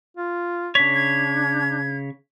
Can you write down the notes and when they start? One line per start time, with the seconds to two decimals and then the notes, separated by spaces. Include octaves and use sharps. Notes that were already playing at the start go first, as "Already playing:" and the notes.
0.17 F4
0.75 C#3 D4 C#5 B6
0.95 G#6